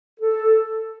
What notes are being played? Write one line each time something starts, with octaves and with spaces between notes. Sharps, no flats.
A4